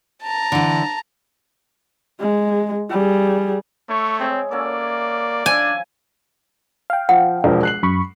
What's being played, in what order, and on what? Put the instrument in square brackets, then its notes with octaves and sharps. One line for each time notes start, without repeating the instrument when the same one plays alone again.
[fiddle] A5 A#5
[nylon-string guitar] D3 E3
[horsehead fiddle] G#3
G3 G#4
[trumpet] A3 [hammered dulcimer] E4 [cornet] C#5
[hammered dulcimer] G#3 G#4 C#5 [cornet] C4
[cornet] A#3 [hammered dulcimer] C#4 F#4 A4 [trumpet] D5
[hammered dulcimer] F3 E4 [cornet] D4 [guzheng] G#5
[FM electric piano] F5 G5
[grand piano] F3 [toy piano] F#5
[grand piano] E1 F3 A#4
F#6 C7 F#7
[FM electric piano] F#2 B5 C#6